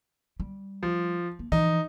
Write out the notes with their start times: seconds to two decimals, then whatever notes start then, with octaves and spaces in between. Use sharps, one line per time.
0.40 G3
0.83 F3
1.39 A#3
1.52 E3 F3 D#4